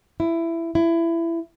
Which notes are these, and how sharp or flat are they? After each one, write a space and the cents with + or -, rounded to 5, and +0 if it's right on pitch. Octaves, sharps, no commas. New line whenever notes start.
E4 +15
E4 +20